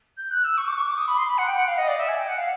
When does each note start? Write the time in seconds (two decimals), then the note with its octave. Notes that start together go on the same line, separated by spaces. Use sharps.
0.17 G6
0.31 F#6
0.44 E6
0.57 C#6
0.68 D6
0.77 C#6
0.88 D6
0.98 D#6
1.07 B5
1.17 C6
1.28 B5
1.38 F#5
1.47 G5
1.58 F#5
1.68 F5
1.78 D#5
1.88 D5
1.98 E5
2.08 G#5
2.18 G5
2.28 F#5
2.38 F5